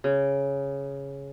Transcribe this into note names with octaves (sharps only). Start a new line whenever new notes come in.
C#3